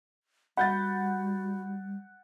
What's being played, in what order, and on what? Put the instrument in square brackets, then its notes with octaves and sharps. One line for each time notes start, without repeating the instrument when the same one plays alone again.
[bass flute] G3 [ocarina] F#4 [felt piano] F#5 G6 A6 [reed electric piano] B5